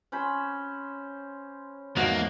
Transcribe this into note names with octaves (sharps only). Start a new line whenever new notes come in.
C#4 C5 B5
E2 G#2 F3 A#3 F#4